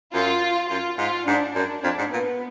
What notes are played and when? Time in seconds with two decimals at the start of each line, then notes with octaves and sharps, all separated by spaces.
0.14 F#2 F4
0.70 F#2 F4
0.98 G#2 F4
1.27 G#2 D4
1.55 F#2 D4
1.83 F2 D4
1.98 G#2
2.12 A#2 B3